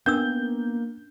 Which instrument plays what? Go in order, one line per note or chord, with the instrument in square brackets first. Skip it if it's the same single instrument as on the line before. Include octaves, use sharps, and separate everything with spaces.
[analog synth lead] A#3 [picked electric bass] B3 [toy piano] C#4 D4 E6 [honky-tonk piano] G6